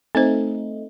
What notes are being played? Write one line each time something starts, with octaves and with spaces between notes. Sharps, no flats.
A3 C4 D#4 C5